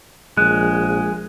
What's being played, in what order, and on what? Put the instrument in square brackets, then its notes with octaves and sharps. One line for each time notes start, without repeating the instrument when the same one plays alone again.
[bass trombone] A#1 [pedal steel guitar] G#3 [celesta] F#6